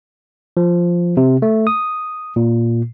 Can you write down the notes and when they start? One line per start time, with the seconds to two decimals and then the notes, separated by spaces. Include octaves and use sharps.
0.57 F3
1.17 C3
1.42 A3
1.67 D#6
2.36 A#2